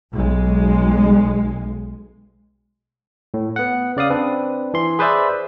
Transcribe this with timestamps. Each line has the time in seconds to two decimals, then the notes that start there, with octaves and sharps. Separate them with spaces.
0.14 B1 G#3
3.34 A2
3.56 B3 F#5
3.97 C#3 D5 F5 D#6
4.10 C4 D4 B4
4.74 E3 C6
4.99 G#4 B4 C5 D5 E5